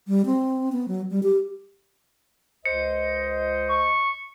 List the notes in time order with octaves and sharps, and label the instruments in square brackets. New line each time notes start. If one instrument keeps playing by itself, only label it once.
[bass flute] G3
C4
B3
F#3
G3
G4
[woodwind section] C#2 C5 D#5 [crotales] C#7
[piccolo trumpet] C#6